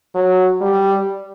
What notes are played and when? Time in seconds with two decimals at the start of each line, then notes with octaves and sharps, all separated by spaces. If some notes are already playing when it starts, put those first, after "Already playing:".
0.15 F#3
0.61 G3